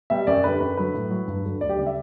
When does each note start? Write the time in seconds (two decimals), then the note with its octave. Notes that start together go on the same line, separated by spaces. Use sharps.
0.10 B2 G3 E5
0.27 F#2 D5
0.44 D3 G3 B4
0.60 F#2 B4
0.77 D3 F#3 B4
0.94 A2
1.11 F#3
1.28 G2
1.44 D3 F#3
1.61 D2 D5
1.69 G4
1.78 C#3 G3 D5
1.86 E5